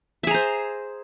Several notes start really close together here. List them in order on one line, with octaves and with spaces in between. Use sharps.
E5 G#4 A#5 C5